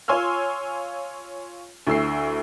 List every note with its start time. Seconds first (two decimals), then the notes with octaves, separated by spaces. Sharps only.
0.08 F4 C#5 G#5 C6 E6 F6
1.87 D2 E4 E6 C7